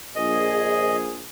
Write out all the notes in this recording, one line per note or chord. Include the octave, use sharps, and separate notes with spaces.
A#1 G#4 D#5